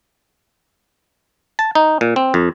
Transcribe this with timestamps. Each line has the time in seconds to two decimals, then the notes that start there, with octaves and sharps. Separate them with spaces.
1.59 A5
1.75 D#4
2.01 A#2
2.16 C4
2.34 F2